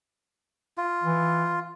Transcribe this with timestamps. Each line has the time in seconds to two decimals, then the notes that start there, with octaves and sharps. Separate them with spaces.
0.78 F4
1.03 E3